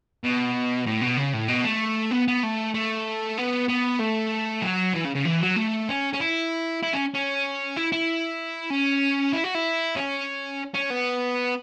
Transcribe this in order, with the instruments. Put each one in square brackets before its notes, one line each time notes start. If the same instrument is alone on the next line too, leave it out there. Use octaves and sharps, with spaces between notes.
[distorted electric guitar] B2
A2
B2
C#3
A2
B2
A3
B3
B3
A3
A3
B3
B3
A3
F#3
E3
C#3
C#3
E3
F#3
A3
C#4
C#4
E4
E4
C#4
C#4
E4
E4
C#4
E4
F#4
E4
C#4
C#4
B3